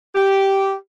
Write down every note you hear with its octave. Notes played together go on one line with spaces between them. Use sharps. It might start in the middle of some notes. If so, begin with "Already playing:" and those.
G4